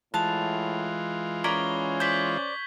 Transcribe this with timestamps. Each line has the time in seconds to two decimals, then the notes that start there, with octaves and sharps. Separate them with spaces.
0.14 A2 E3 G#3 F4 A5 F#6 F7
1.44 C#4 A#4 D5 B5 C#6 G#6 G7
2.00 C5 D5 G6 B6 F#7